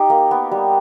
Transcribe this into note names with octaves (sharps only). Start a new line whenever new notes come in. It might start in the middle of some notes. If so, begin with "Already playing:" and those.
Already playing: D#4 G4
A#3
B3
G3